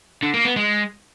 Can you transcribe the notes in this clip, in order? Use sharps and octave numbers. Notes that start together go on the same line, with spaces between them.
D3
A#3
B3
G#3